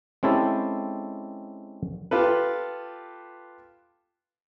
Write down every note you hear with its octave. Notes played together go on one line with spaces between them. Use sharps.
G#3 C4 C#4 E4 G4 A4
F4 G4 A4 B4